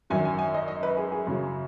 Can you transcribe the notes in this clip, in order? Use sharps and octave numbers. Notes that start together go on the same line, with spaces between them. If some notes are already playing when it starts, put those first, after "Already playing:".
G#1 F#2 F#3 G#5
G#5
G#5
D#5
D#5
B4
G#4
G#4
F#2 C#3 F#3